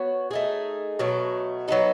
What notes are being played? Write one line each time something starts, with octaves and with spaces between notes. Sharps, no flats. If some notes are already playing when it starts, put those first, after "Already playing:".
Already playing: B3 F#4 C#5
A3 D#4 G#4
B2 F#3 A3
F#3 B3 D#4 A4